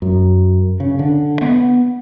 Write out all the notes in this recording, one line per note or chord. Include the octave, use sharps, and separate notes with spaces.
F#2
C#3
D3
B3